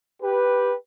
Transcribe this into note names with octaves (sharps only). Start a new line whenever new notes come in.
G4 B4